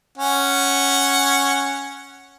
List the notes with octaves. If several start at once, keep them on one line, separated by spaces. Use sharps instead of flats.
C#4 F#5